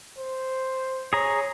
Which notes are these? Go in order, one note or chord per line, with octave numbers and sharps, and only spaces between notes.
C5
G#4 C#5 A#5